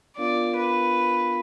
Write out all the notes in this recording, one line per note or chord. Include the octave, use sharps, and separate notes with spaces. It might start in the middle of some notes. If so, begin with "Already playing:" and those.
B3 D4 F4 A#4 D5 F5
B4